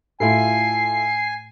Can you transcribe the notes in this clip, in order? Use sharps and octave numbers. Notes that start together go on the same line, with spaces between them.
A2 A3 E4 F4 A4 G#5 C7